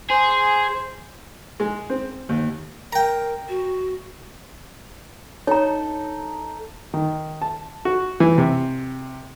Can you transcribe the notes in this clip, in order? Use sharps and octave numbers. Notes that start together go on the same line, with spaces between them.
G#4 C5
G#3
C4
D#2
A#4 G5 A#5
F#4
D#4 A4 C#5 A#5
D#3
A5
F#4
E3
C3